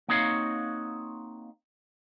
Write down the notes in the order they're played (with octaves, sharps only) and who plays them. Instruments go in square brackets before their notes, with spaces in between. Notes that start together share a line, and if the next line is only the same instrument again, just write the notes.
[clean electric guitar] A#3 C4 D#4 F#4 C#5 F5